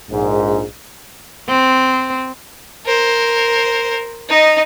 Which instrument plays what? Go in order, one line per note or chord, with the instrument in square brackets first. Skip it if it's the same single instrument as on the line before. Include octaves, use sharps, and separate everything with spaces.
[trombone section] A#1 G#2
[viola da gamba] C4
[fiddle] A#4 C5
D#4 D#5